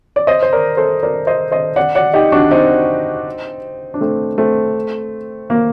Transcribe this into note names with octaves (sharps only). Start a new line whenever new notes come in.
D5
C5 D#5
C5
A#4 D5
A4 C5
A#4 D5
C5 D#5
C5 D#5
D5 F#5
D5 F#5
D#4 G4
D4 F#4
C4 D#4
D4
A3 C4
A3 C4
A#3